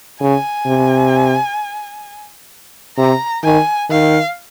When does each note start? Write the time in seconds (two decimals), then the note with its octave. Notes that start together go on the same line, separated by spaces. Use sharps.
0.21 C#3 G#5
0.66 C3
2.97 C3 A#5
3.44 D#3 G#5
3.90 D#3 F5